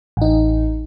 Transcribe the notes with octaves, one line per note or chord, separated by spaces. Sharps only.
A1 D#4